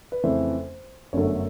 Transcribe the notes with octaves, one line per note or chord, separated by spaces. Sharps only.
B4
F2 C#3 E3 A3 C5
G1 F#2 D3 F#3 A3 C#5